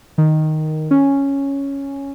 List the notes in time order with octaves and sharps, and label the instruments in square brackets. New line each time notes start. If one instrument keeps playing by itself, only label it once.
[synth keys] D#3
C#4